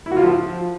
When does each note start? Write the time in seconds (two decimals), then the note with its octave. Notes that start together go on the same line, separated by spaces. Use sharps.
0.06 E4
0.11 F#4
0.17 F4
0.22 F3